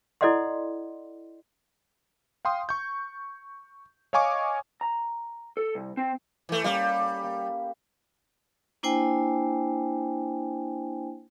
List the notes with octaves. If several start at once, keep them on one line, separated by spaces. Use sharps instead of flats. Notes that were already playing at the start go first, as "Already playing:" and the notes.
E4 A4 D5 D#5 F#5 C6
F5 G5 C6 D#6
C#6 G6
C#5 D#5 F5 G#5 C#6 D6
A#5
A4
C2
C4
E3 A3
G3 A#3 C#4 G5
A#3
A#3 D4 E4 C5 G5 G#5